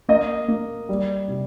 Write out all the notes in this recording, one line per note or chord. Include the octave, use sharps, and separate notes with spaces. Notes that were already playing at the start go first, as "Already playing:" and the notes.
A#3 D#5
A#3
G3
C3